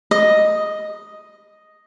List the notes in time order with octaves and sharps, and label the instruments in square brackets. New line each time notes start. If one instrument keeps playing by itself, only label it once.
[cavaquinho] D#5